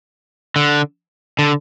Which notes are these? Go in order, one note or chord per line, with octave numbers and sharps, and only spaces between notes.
D3
D3